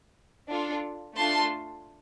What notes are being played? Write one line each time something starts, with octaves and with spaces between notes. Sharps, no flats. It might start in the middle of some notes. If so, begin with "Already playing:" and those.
D4 F4 A4
A3 D4 F4 A4 A5 C6